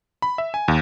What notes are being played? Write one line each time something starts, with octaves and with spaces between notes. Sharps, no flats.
B5
E5
G#5
D#2